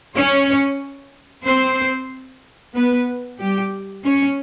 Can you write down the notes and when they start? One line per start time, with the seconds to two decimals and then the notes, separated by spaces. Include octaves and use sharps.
0.15 C#4 C#5
1.45 C4 C5
2.75 B3 B4
3.39 G3 G4
4.04 C#4 C#5